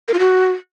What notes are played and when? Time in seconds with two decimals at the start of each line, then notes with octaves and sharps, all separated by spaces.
0.08 A#4
0.14 F4
0.19 F#4